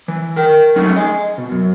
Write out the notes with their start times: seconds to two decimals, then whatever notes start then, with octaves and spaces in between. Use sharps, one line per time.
0.08 E3
0.36 A#4 G5
0.76 F2 F#3 A3 C#4 D#4
0.96 D#5 G#5
1.38 B2
1.51 F#2